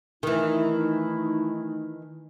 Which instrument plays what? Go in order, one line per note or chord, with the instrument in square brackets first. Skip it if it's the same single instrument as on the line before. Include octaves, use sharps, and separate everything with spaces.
[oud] D#3 E3 [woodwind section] A3 D#4 E4